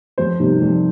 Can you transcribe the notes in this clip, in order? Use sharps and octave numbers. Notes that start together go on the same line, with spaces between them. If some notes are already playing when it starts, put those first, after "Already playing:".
F2 C5
C3 D#3 G3
F2